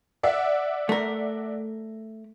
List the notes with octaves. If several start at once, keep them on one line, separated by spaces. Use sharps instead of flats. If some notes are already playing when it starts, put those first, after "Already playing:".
D5 E5 F#5
A3 A#4